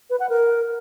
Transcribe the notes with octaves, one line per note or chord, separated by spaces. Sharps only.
B4
F#5
A#4